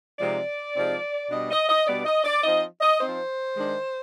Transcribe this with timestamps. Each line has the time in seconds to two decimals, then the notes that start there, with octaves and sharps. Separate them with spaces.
0.19 C3 F3 G#3 C4 D#4 D5
0.75 C3 F3 G#3 C4 D#4
1.31 B2 G3 B3 D4 D#5
1.51 D#5
1.69 D#5
1.87 B2 G3 B3 D4 D5
2.05 D#5
2.24 D5
2.43 F3 C4 D#4 D#5
2.81 D#5
2.99 F3 C4 D#4 C5
3.56 D#3 G#3 D4